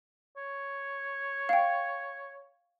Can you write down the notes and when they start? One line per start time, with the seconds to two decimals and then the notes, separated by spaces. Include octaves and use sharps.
0.37 C#5
1.49 F5 G5